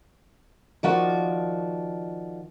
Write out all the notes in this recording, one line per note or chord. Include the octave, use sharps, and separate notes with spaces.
D#3 F3 F#4 D5